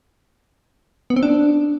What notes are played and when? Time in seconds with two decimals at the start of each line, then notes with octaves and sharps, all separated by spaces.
1.10 B3
1.16 C4
1.23 D4